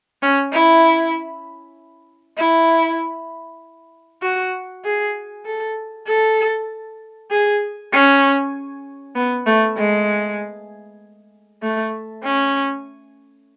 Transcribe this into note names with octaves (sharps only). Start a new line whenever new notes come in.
C#4
E4
E4
F#4
G#4
A4
A4
G#4
C#4
B3
A3
G#3
A3
C#4